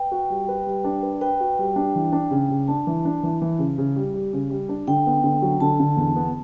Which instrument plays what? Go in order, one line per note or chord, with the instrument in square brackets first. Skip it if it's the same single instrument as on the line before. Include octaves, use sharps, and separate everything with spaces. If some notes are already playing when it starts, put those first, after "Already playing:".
Already playing: [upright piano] B4 [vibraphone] G5
[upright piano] F#4
G3
B4
G3
D4
B4
[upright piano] B4 [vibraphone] G5
[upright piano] F#4
G3
D4
E3
D4
C#3
C#3
[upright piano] D4 [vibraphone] A5
[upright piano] E3
D4
E3
E3
C#3
C#3
G3
G3
C#3
G3
D4
[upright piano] D3 [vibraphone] G5
[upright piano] B3
D3
F#3
[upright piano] D3 [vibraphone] A5
[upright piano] D3
E2
B3